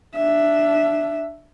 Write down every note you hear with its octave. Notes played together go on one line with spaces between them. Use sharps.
D4 E5